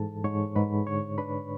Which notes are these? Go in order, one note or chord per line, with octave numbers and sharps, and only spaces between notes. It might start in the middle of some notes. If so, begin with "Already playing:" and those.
Already playing: G#2 E3 A4 A5
G#2 C#5 C#6
G#2 B4 B5
D3 C#5 C#6
D4 B4 B5